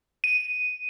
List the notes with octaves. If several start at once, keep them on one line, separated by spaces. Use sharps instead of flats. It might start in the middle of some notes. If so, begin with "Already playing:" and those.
D#7